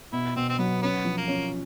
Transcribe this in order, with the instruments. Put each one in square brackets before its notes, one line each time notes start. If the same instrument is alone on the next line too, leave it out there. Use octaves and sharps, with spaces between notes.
[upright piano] B2 [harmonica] E4
[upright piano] B2 [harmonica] C4
[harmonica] C4
[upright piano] F#3 [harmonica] B3
[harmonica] B3 [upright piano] C#4
[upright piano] F3
[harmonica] A#3
[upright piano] C#4